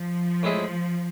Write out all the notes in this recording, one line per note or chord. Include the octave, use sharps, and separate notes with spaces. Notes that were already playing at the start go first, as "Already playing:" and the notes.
Already playing: F3
A2 G#3 C4 E4 G#4